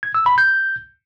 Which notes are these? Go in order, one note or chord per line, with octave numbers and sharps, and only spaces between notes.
G#6
E6
B5
G6